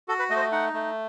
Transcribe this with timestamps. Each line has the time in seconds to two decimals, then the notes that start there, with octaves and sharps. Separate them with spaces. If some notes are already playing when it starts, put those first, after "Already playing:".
0.08 F#4 A4
0.19 B4
0.30 A3 D#5
0.36 C5
0.41 D#5
0.52 D#4 F#5
0.73 A3